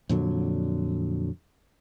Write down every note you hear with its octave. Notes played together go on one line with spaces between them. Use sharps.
F2 A#2 D3 F#3